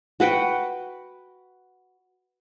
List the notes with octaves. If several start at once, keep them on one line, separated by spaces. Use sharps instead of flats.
F#4 B4 F#5 G5